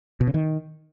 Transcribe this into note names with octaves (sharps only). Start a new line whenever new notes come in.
B2
C#3
D#3